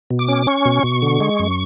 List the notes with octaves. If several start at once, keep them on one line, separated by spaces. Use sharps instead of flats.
B2
D6
C#4
C#4 C#6
B2
B2
D3
G#3
F#2